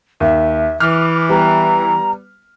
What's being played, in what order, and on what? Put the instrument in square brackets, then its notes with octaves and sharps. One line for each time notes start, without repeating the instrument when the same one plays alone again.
[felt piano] D#2 [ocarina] E5
[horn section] E3 [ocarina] D6 [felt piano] F6
[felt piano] G3 B3 [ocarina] A#5